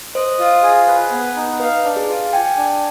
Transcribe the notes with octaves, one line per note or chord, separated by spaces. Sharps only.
C5 D#5
F4
G#4
B4
B3
D#4
B4 F5
D4
G#4
F4
G5 G#5
D4